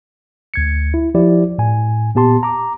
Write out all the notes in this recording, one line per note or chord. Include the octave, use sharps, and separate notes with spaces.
D2 G#6 C#7
E4
F3 E4 G4 D5
A2 G#5
A#2 B3 G4 A5 C6
A#5 D6